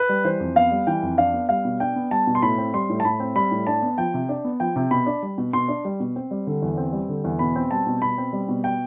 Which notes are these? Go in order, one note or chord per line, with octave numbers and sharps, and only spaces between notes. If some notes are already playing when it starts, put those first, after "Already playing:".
Already playing: B4
G3
E3 C5
F2
B3 F5
G3
E3 G5
F2
D4 F5
B3
G3 F5
B2
D4 G5
B3
G3 A5
B2
C6
A2 B5
C4
G3 C6
A2
A5
A2 B5
C4
G3 B5
A2
D4 A5
B3
F3 G5
C3
D4
B3
F3 G5
C3
B2 B5
D4
G3
B2
B2 C6
D4
G3
B2
C4
G3
D3
E2
C4
G3
D3
E2
B2 B5
C4
G3 A5
B2
B2 B5
C4
G3
B2
G5